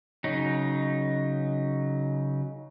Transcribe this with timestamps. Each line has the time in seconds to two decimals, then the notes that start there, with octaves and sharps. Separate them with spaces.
0.24 C#3 F#3 D#4